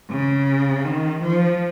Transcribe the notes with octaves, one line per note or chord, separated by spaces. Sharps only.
C#3
D#3
F3